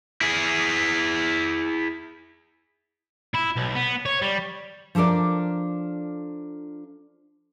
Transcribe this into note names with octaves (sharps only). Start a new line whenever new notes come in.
E4 G#4
E4
B1
B3
C#5
G3
F3 D4 A4 A#4 D5